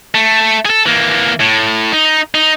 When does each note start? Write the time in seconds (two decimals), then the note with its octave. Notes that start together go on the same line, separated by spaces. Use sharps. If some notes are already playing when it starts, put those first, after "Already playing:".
0.15 A3
0.65 G#4 A4
0.86 E3 A#3
1.40 A2
1.92 D#4
2.35 D#4